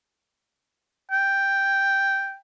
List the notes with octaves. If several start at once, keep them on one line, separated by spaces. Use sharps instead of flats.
G5